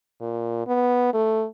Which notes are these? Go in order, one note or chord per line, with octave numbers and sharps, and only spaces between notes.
A#2
B3
A3